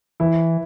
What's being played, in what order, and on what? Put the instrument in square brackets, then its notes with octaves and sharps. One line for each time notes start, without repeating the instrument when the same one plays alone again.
[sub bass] E3 [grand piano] E4